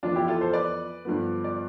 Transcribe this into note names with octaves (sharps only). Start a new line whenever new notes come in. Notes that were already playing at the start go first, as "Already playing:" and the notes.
F2 E3 B3 D4 F4
E4 G4
F4 A4
A4 C5
B4 D5
G2 D3 F3 B3
D5